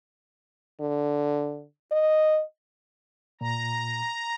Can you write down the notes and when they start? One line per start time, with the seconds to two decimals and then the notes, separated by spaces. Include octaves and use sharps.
0.80 D3
1.92 D#5
3.41 A#2 A#5